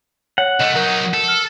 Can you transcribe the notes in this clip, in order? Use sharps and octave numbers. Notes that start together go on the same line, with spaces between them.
C#5 F#5
C2 A3 D#5 E7
F#3 D#4 A#4
A4
F6